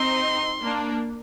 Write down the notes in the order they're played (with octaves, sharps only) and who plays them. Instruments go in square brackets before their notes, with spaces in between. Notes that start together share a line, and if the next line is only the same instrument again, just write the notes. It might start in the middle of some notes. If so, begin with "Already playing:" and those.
Already playing: [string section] C4 D#4 [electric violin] C6
[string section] A#3 D4